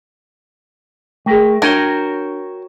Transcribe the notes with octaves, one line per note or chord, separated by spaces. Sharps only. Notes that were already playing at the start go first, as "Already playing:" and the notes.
A3 G#4 A#4 G5
D4 F#4 A#4 C#5 G5 D#7 G7